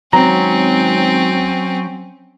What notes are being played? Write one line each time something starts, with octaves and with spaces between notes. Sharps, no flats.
G#1 F#3 C4 C#4 A#5